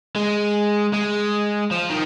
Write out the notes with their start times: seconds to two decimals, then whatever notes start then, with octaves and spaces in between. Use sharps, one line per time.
0.16 G#3
0.93 G#3
1.71 F3
1.90 D#3